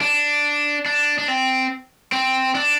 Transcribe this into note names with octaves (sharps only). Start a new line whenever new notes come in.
D4
D4
D4
C4
C4
D4